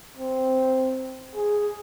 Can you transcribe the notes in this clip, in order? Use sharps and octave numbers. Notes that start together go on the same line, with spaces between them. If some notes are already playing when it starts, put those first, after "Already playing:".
C4
G#4